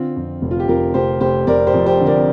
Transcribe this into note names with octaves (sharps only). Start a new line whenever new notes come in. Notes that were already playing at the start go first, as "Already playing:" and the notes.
Already playing: D3 C4 F4
F2
F1
F4
G4
F1 F4 A#4
F1 G4 C5
F1 G4 C5
F1 A#4 D5
G4 C5
F2
G4 C5
D3
A#4 D5